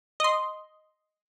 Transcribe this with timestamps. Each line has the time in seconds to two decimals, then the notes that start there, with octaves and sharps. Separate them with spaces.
0.20 D#5 C6